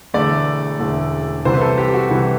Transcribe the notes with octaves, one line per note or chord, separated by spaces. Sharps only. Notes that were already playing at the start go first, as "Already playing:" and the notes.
E1 E2 D3 A3 D5
E1 E2 D3 A3
C2 C3 E3 C5
B4
A4
G4
F#4
C2 C3 E3